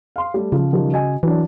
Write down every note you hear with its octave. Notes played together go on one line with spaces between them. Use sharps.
F5 C6
G3 A3
C#3 F3 F4
D#3 F3 G3
F#4 D#5 G#5
E3 F#3 D4